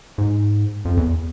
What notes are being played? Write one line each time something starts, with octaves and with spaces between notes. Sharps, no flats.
G#2
F2
E2